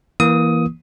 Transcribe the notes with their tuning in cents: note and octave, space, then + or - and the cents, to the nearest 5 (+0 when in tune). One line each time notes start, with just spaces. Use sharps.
E3 +0 A#3 +20 D#6 +15